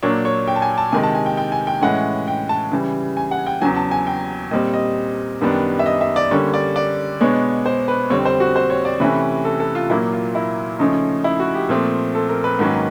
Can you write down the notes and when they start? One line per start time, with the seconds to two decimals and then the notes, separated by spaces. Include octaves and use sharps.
0.03 A#2 F#3 A#3 D4 C#5
0.25 C#5
0.47 G5
0.56 A5
0.62 G#5
0.78 A5
0.92 C3 D#3 G#3 G#5
1.03 A5
1.15 G#5
1.26 G5
1.37 G5
1.52 G#5
1.67 G5
1.82 A2 E3 G#3 C#4 F#5
2.28 G5
2.49 A5
2.72 C#3 E3 G3
3.17 G#5
3.31 F#5
3.46 G5
3.62 E2 C#3 F#3 G#5
3.76 A5
3.91 G#5
4.07 G5
4.51 A#2 G3 C4 D#5
4.74 D#5
5.41 F#2 D#3 G3 B3 D4
5.79 E5
5.86 D#5
6.01 E5
6.16 D5
6.31 D3 G3 A#3 C#4 C#5
6.54 D5
6.76 D5
7.21 B2 G#3 B3 D4 C#5
7.66 C5
7.88 B4
8.10 F2 D3 G3 C4 C#5
8.25 C5
8.40 F#4
8.56 C5
8.70 C#5
8.85 D5
9.00 C3 E3 A3 C#4 B4
9.45 A4
9.60 A4
9.75 F4
9.90 A#2 F#3 A#3 E4
10.12 F4
10.35 E4
10.79 C#3 F3 A3 C#4 D#4
11.24 E4
11.40 F#4
11.55 G4
11.69 A#2 F3 A3 C4
12.15 A4
12.29 A#4
12.44 B4
12.59 G#2 D#3 F#3 A#3 C#4